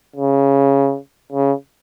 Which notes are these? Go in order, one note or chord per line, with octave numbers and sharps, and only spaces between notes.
C#3
C#3